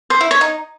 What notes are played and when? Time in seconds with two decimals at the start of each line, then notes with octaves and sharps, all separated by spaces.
0.10 C5
0.21 E4
0.31 C#5
0.41 D#4